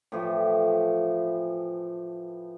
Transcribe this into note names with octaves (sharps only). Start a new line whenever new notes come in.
A2 E3 F3 G4